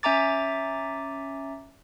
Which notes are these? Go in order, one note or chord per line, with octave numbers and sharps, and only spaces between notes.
C#4 E5 G#5 A#5 D6 A6